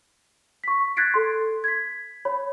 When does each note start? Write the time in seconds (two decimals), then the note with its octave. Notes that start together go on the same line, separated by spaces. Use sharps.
0.64 C#6 B6
0.97 F#6 G#6 A6 B6 C7 D7
1.14 A4 C6
1.64 G#6 B6
2.25 C#5 B5